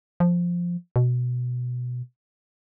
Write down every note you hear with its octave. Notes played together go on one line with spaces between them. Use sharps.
F3
B2